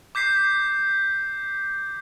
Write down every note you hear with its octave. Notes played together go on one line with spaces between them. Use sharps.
D6 G6 B6 C7